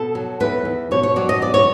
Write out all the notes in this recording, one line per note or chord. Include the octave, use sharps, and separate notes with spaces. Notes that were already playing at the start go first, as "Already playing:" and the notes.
Already playing: B2 A4
F#3
E2 B4
E2
B2 C#5
C#5
F#3 D5
D#5
E2 D5
C#5